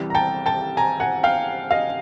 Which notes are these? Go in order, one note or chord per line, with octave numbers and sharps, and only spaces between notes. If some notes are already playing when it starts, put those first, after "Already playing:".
Already playing: C2 C3 E3 G3
A#5
G5 A5
G5 A5
G#5 A#5
F#5 G#5
F5 G5
D#5 F5